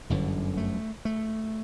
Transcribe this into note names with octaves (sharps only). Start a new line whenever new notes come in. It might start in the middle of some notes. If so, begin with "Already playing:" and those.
G1 F#2 D3 E3
A3
A3